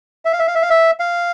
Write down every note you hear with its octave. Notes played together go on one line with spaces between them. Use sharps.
E5
F5
E5
F5
E5
F5
E5
F5